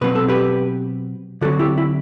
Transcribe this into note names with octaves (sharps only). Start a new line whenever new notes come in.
B2 F#3 C4 B4
A4
G4 B4
D3 F#3 C4 F#4 A4
E4 G4
E4